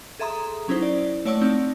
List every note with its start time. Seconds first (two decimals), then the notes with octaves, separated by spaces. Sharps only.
0.19 G#4 A4 E5 A#5 C6 D#6
0.68 F#3 C#4 D#4 E4 C5
0.82 D5
1.25 A3 C#5 D5 F#5 C#6 E6
1.42 A3 C4 D#4